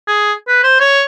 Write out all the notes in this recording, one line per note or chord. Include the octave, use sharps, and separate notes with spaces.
G#4
B4
C5
C#5